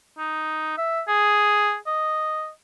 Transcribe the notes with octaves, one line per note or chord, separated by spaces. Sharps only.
D#4
E5
G#4
D#5